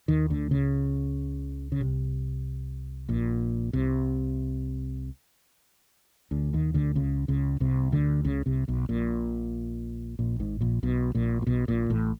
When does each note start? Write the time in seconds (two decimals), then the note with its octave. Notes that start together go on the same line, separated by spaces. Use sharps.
0.08 D#2 D#3
0.30 D2 D3
0.51 C#2 C#3
1.72 C#3
1.81 C2 C3
3.09 A#1 A#2
3.73 C2 C3
6.31 D2 D3
6.53 D#2 D#3
6.74 D2 D3
6.95 C#2 C#3
7.28 C#2 C#3
7.60 C2 C3
7.92 D2 D3
8.25 C#2 C#3
8.46 C2 C3
8.68 B1 B2
8.89 A#1 A#2
10.19 A#1 A#2
10.40 G#1 G#2
10.61 A#1 A#2
10.83 B1 B2
11.15 A#1 A#2
11.42 A#2
11.47 B1 B2
11.68 A#1 A#2
11.90 A1 A2